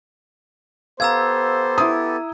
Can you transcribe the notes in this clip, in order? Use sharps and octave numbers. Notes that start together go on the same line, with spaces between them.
B3 G4 A4 C5 F5 A#5 E6 G#6
E4 D#6